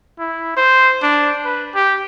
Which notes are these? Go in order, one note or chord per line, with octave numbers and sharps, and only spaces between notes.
E4
C5
D4
B4
G4